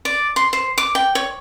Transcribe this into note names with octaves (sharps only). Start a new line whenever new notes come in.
D5
C6
C5
D6
G5
C#5